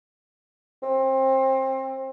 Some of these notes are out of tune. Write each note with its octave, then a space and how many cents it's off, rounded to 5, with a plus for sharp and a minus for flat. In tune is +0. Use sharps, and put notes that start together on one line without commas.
C4 +25